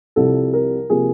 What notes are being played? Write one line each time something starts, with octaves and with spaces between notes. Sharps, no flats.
C2 C3 F3 A4
A#4
C3 F3 A#3 G#4